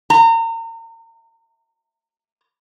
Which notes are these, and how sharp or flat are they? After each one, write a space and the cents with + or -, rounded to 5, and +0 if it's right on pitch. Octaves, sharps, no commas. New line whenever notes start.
A#5 -35